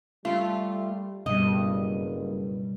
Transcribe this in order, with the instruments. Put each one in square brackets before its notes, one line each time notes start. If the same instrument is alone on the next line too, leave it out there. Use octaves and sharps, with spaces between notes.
[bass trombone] G3 [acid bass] A3 [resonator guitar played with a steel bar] F4
[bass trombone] F#1 [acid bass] G2 [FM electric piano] B2 G3 [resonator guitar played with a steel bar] D#5